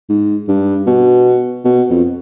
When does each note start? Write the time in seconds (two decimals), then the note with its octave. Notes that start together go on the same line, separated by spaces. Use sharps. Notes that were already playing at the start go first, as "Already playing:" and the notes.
0.09 G#2
0.48 G2
0.87 B2
1.65 B2
1.90 F2